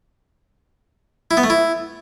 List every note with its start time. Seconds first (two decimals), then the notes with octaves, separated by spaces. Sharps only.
1.31 E4
1.37 B3
1.44 A3
1.50 E4